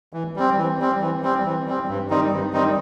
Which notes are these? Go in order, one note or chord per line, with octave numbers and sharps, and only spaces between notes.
E3
G3 C4
E3
G3 C4
E3
G3 C4
E3
G3 C4
G2
D#3 G3 C4 D#4
G2
D#3 G3 C4 D#4